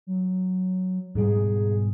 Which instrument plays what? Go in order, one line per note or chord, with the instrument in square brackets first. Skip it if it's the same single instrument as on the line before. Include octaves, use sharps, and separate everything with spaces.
[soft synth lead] F#3
[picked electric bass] G#2 B2 G3 [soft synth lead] G#4